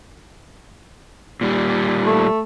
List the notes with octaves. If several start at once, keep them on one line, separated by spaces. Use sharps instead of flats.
A#2 G3
A3